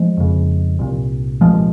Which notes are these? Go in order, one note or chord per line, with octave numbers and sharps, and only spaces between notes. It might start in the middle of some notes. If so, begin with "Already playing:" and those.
Already playing: F3 G#3
F2 C#3
C2 A#2
C2 A#2 F3 G#3